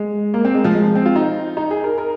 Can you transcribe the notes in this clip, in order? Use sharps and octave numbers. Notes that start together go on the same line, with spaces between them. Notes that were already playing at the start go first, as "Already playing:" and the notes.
Already playing: G#3
A#3
C4
G#3
F3
G#3
C4
F4
D#4
D#4
G#4
A#4
A#4